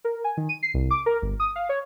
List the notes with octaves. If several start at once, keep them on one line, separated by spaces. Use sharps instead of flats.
A#4
G#5
D#3
D#7
C7
C2
D6
A#4
G1
D#6
F5
C#5